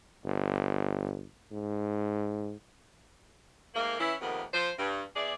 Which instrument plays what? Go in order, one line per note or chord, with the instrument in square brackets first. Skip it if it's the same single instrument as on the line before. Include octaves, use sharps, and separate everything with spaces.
[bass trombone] G1
G#2
[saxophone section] G#2 A3 A#3
E3 C#4 E4
F2 C3 D#3 A#3 B3
F3 C5
G2
E2 E4 G#4 D5